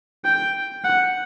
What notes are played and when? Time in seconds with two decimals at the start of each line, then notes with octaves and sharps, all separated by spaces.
0.24 G5
0.84 F#5